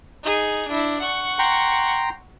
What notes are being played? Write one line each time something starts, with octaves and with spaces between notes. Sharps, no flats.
D#4 G#4
D4 E4
F#5 C#6
G5 A#5 C6